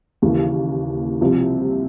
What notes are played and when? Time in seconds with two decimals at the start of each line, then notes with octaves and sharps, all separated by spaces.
0.22 D#2 C#3 E3 A#3
1.21 C2 C3 F3